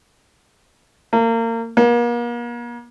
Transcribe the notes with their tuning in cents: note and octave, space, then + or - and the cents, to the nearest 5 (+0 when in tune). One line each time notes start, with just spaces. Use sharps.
A#3 -30
A#3 +40